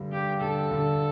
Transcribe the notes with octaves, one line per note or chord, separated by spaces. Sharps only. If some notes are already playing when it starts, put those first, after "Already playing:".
Already playing: G2 D3 G3
G2 G4
D3 A4
D3